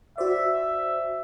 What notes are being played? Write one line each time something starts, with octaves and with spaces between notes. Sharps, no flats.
F#4 C5 D5 E5